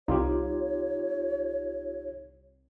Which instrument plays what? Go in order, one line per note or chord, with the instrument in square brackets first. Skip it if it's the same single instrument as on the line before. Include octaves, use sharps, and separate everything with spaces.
[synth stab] C2 [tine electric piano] D#4 F4 G4 [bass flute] C#5